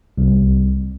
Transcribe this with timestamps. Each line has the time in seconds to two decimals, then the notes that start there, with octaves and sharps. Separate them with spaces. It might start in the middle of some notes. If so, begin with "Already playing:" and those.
0.18 C2